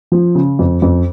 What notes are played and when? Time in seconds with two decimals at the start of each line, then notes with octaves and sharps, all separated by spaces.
0.12 F3
0.35 C#3
0.59 F2
0.82 F2